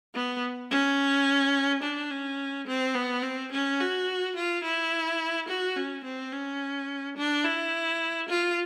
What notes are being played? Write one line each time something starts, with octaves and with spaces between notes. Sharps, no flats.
B3
C#4
D4
C#4
C4
B3
C4
C#4
F#4
F4
E4
F#4
C#4
C4
C#4
D4
E4
F4